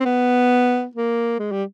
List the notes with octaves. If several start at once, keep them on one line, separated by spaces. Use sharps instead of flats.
C4
B3
A#3
G#3
G3